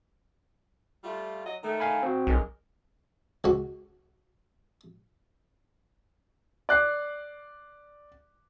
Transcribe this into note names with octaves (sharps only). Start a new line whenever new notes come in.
G3 A3 F4
F#3 D#5
D#3 A3
F5 G#5 B5
C4 F#4
B1 G2 G#3 A#4
C#2 F#4
D5 F#6 C7